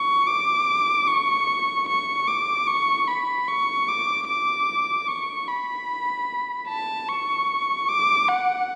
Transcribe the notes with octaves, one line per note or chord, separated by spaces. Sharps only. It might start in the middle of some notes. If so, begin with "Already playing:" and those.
Already playing: C#6
D6
C#6
C#6
D6
C#6
B5
C#6
D6
D6
C#6
B5
A5
C#6
D6
F#5